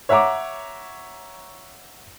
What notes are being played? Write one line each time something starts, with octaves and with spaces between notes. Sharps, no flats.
C#5 E5 F#5 A#5 D6